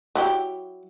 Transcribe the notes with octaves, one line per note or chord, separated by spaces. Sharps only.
F#3 E4 G4